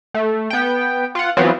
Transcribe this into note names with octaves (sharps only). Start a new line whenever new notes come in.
A3
B3 G5
F4 F#5
E3 F#3 B3 C4 F4